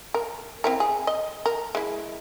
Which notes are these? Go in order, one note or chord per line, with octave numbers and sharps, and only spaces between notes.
A#4
C4 E4 A#4
G#4
D#5
A#4
G#3 E4